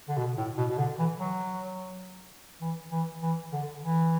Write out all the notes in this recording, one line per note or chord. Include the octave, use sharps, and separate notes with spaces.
D3
B2
A2
B2
B2
D3
E3
F#3
E3
E3
E3
D3
E3